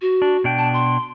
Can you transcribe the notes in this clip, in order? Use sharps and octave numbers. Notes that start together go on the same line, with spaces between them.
F#4
D4
B2 D4 G5
A5
C6